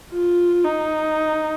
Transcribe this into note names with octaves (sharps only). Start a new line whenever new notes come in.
F4
D#4